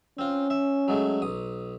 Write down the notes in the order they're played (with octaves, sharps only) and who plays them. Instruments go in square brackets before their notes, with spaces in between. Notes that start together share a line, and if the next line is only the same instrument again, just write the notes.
[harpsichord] C4 F4 [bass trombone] C#4
[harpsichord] E5
F#3 G#3 A3
B1 D#6